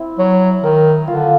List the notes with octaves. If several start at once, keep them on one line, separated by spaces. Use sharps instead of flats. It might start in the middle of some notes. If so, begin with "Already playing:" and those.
Already playing: C4 E4
F#3 C#5
D#3 A#4
D3 F4